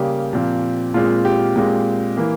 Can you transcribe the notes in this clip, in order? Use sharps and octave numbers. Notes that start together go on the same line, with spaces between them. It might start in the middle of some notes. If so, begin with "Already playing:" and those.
Already playing: C#3 G3 A#3 G4
A#2 F3 C4
A#2 G#3 C4 F4
G4
A#2 G#3 C4
E3 A#3